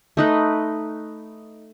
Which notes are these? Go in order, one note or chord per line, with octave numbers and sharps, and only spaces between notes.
A3 D#4 B4